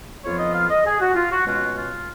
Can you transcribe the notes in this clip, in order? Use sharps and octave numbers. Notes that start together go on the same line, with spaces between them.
F2 F3 B3 F4 C#5
D#5
F5
D#5
G#4
F#4
F4
F#4
B2 G#3 C#4 F4 F#4
F4